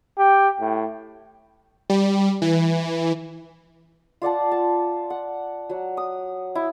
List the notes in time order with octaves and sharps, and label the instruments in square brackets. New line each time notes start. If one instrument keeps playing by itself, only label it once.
[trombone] G4
A2
[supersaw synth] G3
E3
[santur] F4 D5 F#5 A5
A5
F#5
F#3 F#5
D#6
E4